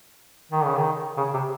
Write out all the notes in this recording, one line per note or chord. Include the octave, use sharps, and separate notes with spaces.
D#3
C#3
D#3
C#3
C3